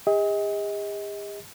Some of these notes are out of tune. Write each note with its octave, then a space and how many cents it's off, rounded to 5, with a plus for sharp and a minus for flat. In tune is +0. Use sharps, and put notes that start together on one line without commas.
G#4 -45 D#5 +30